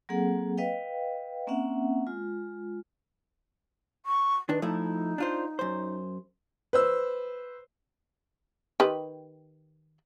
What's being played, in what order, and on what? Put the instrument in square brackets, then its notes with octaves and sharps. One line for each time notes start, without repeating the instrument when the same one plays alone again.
[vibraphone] F#3 A#3 C4 G#4 A4 F#5
B4 D#5 F5 G5
A#3 C4 C#4 E5 F#5
G#3 F4
[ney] C#6
[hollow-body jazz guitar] D#3 D4 [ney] B4
[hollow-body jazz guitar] F3 A3 E4 [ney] D#4
[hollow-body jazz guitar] D4 F4 C5
F#2 C5
[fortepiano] B4 C5 E6
[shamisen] D#3 G4 B4